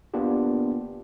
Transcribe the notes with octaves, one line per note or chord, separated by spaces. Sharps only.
A#3 B3 D4 F4 G4